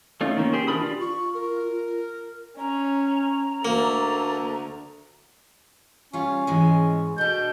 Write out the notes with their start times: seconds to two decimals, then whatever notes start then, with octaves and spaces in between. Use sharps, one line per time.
0.21 A3 C#4 D#4 F4
0.37 D#3 A#3 C#4
0.53 G4 G#4 C5
0.67 E3 D4 A#4 B5 D#6
0.81 F4 G4 D5
1.01 F4 C#6
1.34 A#4
2.59 C#4 A#5
3.65 D2 A#3 A4
6.13 G3 C#4 F4
6.47 G#2 E3 G#3
7.18 B2 D4 A4 G6